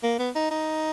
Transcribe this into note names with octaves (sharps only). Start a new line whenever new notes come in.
A#3
B3
D#4
D#4